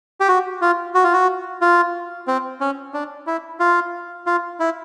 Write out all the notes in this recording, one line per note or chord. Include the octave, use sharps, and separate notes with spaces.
G4
F#4
F4
F#4
F4
F#4
F4
C4
C#4
D4
E4
F4
F4
E4